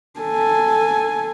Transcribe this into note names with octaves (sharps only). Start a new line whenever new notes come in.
A4 G#5